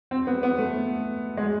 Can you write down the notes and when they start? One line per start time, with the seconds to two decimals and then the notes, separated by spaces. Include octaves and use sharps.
0.11 C4
0.27 B3
0.43 B3
0.58 A3
1.37 G#3